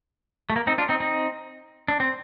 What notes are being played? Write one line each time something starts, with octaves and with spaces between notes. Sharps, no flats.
A3
A#3
C4 D#4
D4 F4
C4 D#4
C4 D#4
D4
C4